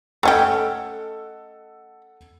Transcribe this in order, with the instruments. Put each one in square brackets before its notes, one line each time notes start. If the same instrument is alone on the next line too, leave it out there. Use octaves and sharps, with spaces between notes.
[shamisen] A3 C#4 G4 [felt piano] A4 D#5 F#5